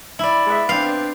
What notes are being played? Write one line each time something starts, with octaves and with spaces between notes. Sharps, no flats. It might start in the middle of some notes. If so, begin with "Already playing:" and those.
E4 D5
G#3 B3 E5
B3 C4 D4 F5